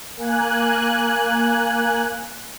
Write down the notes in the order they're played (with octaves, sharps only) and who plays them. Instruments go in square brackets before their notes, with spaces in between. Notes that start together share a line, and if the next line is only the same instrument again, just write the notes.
[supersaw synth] A#3 G#5 F#6